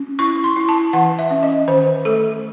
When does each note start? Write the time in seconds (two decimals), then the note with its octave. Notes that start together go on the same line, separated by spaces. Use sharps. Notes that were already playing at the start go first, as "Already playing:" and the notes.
Already playing: C#4
0.19 E4 C#6
0.44 C6
0.56 E4
0.69 A5
0.93 E3 F#5
1.19 E5
1.31 C#4
1.43 D#5
1.68 D#3 C5
2.05 A3 A4